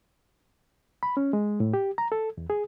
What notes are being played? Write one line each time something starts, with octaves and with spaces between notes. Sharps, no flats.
B5
C#4
G#3
A2
G4
A#5
A4
E2
G#4